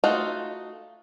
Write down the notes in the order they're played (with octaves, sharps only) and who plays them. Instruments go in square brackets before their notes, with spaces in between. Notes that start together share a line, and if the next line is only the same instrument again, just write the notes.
[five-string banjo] A3 D#4 F4 F#4